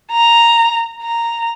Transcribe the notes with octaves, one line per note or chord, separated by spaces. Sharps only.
A#5
A#5